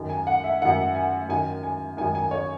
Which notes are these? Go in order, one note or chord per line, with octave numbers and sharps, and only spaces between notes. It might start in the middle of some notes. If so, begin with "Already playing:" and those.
Already playing: F#2 D#3
G#5
F#5
E5
F#2 D#3 F#5
G#5
F#2 D#3 G#5
G#5
F#2 D#3 G#5
G#5
C#5